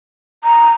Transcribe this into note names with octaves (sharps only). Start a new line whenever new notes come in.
A#5